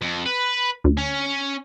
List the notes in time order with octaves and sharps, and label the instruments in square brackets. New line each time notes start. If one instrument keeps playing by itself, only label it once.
[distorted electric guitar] F2
B4
[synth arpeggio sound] D2
[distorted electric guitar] C#4